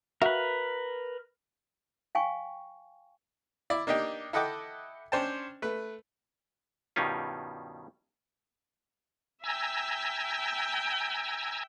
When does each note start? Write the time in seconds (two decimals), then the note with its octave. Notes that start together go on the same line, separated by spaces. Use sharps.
0.22 F#4 A#4 B4 E5 F5
2.15 F5 G5 G#5 C#6
3.70 E4 D5
3.87 A#3 D4 D#4 G4 G5
4.33 E4 A4 D#5 F#5 G5 D6
5.12 C#4 D4 C5 G5 A5
5.62 A3 B4
6.96 G2 B2 D#3 G3 C#4 F4
9.44 E5 G5 G#5 A#5 E6